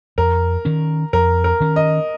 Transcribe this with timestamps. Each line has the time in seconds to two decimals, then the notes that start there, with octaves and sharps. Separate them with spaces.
0.18 F2 A#4
0.65 D#3 C#4
1.13 F2 A#4
1.44 A#4
1.60 D#3 C#4
1.76 D#5